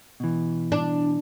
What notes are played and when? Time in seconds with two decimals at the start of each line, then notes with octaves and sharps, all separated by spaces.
0.20 B2 E3
0.72 D4